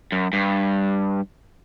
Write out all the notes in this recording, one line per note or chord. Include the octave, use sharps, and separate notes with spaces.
F#2
G2